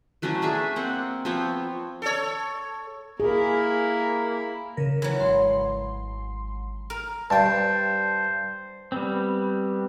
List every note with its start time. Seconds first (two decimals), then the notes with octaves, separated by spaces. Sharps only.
0.22 E3 F#3 A3 C#4
0.42 D4 G#4 E5 G#5
0.76 A#3 C4 F#5
1.25 F3 B3 C4 C#5
2.02 A4 C#5
3.20 A#3 E4 G#4 A#4
4.77 C#3 A#4
5.02 E3 F#3
5.19 G#1 C6
6.90 A#4
7.30 G2 C5 G5 A5
8.92 G3 B3 C4